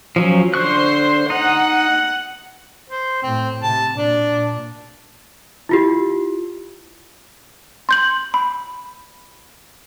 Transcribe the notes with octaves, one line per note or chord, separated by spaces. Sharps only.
F3 F#3 C#4
D3 C5 C6 C#6 F#6
D#4 F#5
C5
A2 C4
C3 A5
A#2 D4
E4 F4 G4
C6 G6 F#7
B5